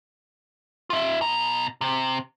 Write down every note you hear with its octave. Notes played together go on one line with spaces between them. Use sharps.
F4 E5
B2 A#5
C3